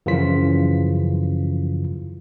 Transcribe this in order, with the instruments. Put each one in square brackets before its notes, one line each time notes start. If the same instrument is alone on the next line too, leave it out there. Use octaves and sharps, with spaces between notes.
[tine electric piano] F#2 C#3 E3 F3 F4 B6